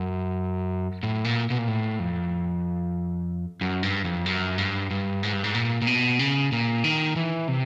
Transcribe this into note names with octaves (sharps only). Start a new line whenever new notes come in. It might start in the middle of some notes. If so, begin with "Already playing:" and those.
Already playing: F#2
A2
A#2
B2
A#2
A2
F2
F#2
G2
F2
F#2
G2
G2
G#2
G2
G#2
A#2
A#2
B2
C#3
A#2
D#3
E3
C3